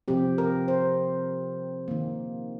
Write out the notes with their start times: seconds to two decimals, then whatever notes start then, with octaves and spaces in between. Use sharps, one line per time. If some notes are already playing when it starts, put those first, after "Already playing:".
0.08 C3 F3 C4 G4
0.38 A#4
0.68 C5
1.88 D#3 A#3